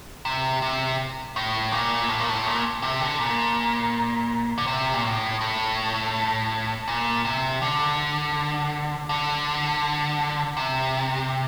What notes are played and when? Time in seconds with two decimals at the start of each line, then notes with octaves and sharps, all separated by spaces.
0.25 C3
0.62 C3
1.36 A2
1.72 A#2
2.09 A2
2.19 A#2
2.29 A2
2.46 A#2
2.82 C3
3.01 D3
3.20 A#2
4.58 D3
4.67 C3
4.94 A#2
5.03 A2
5.41 A2
6.88 A#2
7.25 C3
7.62 D3
9.09 D3
10.57 C3